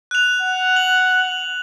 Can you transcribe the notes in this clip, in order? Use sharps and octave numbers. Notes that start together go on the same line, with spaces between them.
F#6 F7
F#5
F#7